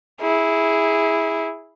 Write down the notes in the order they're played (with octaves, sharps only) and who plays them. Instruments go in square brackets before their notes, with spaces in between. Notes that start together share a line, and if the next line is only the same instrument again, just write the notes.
[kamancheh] E4 G#4